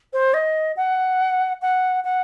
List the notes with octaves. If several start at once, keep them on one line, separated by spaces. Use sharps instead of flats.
C5
D#5
F#5
F#5
F#5